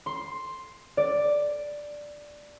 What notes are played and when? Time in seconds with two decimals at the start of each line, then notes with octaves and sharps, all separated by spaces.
0.06 C6
0.97 D5